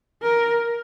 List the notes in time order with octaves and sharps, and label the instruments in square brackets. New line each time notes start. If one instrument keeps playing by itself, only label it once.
[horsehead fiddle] A#4